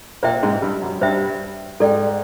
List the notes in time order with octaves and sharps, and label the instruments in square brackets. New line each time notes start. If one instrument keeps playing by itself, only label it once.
[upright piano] A#2 A#3 [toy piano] C5 E5 G5
[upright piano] G#2 G#3
G2 G3
F#2 F#3
[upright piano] G2 G3 [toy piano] C5 E5 G5
[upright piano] G#2 G#3 [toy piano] A4 D5 G5